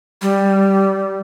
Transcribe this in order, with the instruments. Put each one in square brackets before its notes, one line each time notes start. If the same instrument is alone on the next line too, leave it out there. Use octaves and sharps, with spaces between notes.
[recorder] G3